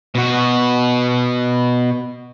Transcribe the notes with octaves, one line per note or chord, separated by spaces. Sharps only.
B2 F#4